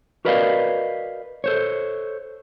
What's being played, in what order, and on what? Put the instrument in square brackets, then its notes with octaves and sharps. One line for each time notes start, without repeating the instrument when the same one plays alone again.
[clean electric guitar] F#4 A#4 B4 D5 D#5 F5
A4 C5 C#5